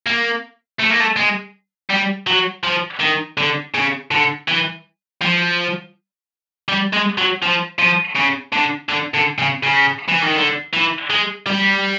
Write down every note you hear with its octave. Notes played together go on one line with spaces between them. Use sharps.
A#3
A3
A#3
A3
G#3
G3
F#3
F3
D#3
D3
C#3
D3
E3
F3
G3
G#3
F#3
F3
F3
C#3
D3
D3
D3
C#3
C#3
E3
D#3
D3
E3
G#3
G3